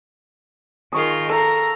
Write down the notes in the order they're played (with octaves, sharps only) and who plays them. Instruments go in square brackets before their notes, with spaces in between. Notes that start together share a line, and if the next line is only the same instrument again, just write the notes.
[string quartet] D#3 F4 [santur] G#4 C#6 D#6
[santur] A4 F5 [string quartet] A#5